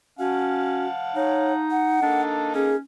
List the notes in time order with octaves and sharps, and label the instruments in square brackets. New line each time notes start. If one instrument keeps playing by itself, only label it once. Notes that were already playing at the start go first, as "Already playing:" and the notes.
[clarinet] C#4 [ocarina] F#4 [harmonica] F5 F#5 A5
[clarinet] D#4 [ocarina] C#5
[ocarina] F#5
[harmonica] A#3 D#4 A4 [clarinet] D4
[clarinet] C#4 [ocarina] G#4